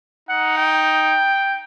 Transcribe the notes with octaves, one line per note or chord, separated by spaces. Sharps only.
D#4 F#5
G5